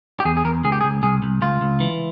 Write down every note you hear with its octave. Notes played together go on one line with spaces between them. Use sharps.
G4
E2 G#4
G#4
E2 A#4
C#2 G#4
G4
G#4
C#2
C2 G#4
C2
C#2 F4
C#2
E3